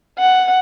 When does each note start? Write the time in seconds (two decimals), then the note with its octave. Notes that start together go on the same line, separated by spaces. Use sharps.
0.19 F#5